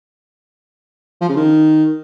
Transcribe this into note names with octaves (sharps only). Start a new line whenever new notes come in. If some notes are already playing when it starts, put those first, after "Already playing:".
F3
C#3
D#3